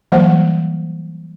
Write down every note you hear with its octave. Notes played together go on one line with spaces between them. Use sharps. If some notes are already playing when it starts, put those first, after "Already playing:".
E3 F#3 G3 A#3 C5 F#5